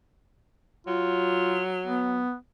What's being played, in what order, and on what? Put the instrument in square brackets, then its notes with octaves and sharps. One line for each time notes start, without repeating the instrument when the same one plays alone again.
[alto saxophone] F#3 [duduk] F4
[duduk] B3